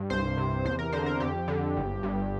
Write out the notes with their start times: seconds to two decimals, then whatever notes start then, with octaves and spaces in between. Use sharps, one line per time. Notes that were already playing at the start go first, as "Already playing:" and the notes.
Already playing: G2
0.10 C2 C5
0.37 C3
0.65 E2 C5
0.79 A#4
0.92 D3 C5
1.06 A#4
1.20 F2 G4
1.48 D3
1.77 G1
2.03 G2